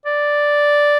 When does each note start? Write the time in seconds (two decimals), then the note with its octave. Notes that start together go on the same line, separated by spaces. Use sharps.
0.06 D5